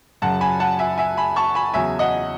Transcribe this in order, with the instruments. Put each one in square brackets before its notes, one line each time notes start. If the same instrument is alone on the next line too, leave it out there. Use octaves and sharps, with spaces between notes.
[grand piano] F#2 C#3 F#3 F#5 A5
G#5 B5
F#5 A5
E5 G#5
E5 G#5
G#5 B5
A5 C#6
G#5 B5
E2 C#3 F#3 E5 G#5
D#5 F#5